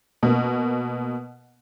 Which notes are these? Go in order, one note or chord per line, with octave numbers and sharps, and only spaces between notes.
B2 A#3